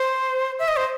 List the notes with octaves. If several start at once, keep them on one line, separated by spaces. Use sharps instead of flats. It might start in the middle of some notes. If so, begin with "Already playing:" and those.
Already playing: C5
E5
D#5
C5